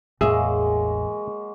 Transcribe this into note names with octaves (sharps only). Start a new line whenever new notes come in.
A1 E2 F#3 G#3 A#3 G#4 E5